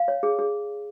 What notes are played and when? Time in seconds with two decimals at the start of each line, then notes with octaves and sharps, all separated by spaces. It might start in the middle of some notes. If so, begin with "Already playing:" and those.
Already playing: F5
0.08 C#5
0.23 G#4
0.39 G#4